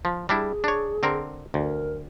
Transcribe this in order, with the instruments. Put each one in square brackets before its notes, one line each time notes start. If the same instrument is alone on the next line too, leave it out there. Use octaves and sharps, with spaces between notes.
[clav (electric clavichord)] F3
[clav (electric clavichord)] G3 D4 E4 [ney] G#4
[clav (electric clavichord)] D4 C#5
D3 C4 A#4
[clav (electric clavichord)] D2 [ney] A#4